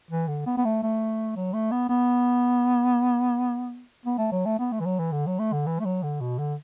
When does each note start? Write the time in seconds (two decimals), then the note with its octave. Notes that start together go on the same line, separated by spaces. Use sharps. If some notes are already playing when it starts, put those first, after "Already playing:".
0.11 E3
0.28 D3
0.46 B3
0.57 B3
0.65 A3
0.83 A3
1.36 F#3
1.54 A3
1.71 B3
1.89 B3
4.06 B3
4.18 A3
4.32 F#3
4.46 A3
4.59 B3
4.72 A3
4.80 E3
4.86 F#3
5.00 E3
5.12 D3
5.27 F#3
5.39 A3
5.53 D3
5.67 E3
5.80 A3
5.85 F#3
6.03 D3
6.21 B2
6.39 D3